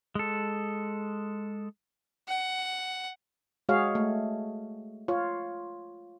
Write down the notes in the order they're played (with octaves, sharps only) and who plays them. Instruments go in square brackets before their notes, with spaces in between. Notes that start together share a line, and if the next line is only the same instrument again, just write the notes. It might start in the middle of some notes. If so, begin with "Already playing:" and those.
[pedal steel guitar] G#3 A4
[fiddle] F#5
[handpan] G#3 F#4 G#4 C#5 F5
A3
F4 C#5